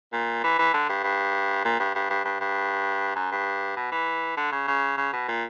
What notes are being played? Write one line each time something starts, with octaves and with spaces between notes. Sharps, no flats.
A#2
E3
E3
D3
G2
G2
A#2
G2
G2
G2
G2
G2
F#2
G2
B2
E3
D3
C#3
C#3
C#3
B2
A#2